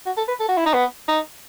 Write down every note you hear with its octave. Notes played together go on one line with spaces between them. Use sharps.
F#4
A4
B4
A4
F#4
E4
D#4
B3
D#4